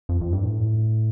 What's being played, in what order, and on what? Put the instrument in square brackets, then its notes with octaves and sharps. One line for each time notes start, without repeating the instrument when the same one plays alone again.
[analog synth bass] F2
F2
G2
A2